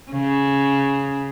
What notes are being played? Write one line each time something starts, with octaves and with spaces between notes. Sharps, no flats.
C#3